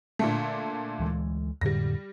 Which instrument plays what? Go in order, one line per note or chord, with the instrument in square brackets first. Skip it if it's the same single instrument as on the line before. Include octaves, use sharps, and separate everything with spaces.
[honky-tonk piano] A#2 D3 A3
[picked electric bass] D2 E3 G#3
[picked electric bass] F2 A2 D3 [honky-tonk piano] G3 A#6